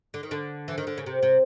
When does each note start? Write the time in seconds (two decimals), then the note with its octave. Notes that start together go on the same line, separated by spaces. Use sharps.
0.14 D3
0.23 D#3
0.31 D3
0.68 E3
0.78 D#3
0.87 D3
0.98 C#3
1.06 C3
1.23 C3